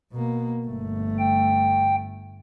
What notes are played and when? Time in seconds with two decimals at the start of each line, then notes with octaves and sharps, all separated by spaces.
0.12 B2 A#3
0.66 G1 A3
1.19 G5